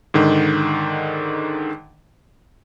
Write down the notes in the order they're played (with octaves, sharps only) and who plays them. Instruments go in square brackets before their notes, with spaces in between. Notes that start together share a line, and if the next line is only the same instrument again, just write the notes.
[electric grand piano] G#2 D3 D#3